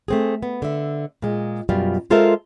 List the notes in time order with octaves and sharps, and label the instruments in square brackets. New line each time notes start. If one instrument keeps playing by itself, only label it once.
[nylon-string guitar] A3 C4 G#4
B3
D3 E5
A#2 G#3
F#2 B2 G3 F4
G#3 F4 A4 A#4 C5 E5